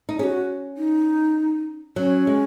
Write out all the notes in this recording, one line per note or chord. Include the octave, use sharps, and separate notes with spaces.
D#4
C#4 F#4 G#4
D#4
F#3 C#4
G#3